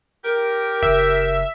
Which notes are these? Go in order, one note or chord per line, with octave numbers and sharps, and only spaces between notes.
G4 A#4
F#1 E5